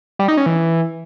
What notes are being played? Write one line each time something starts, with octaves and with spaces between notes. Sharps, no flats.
G3
D#4
C#4
E3